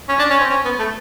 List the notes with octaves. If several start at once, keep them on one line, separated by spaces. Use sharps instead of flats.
C#4
D4
C#4
C4
C#4
B3
A3